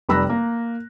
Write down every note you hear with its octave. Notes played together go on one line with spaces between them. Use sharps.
F1 G3 B5 E6 F#6 A#6
A#3